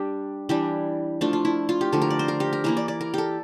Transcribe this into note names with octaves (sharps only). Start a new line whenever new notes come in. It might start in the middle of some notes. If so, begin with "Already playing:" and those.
Already playing: G3 D4 G4
E3 G3 D4 G4
F3 A3 D4 F4
F4
E4
F4
G4
D3 F3 A3 A4
A#4
D5
C5
A#4
G4
A#4
E3 A#3 E4 A#4
D5
D5
A#4
G4 A4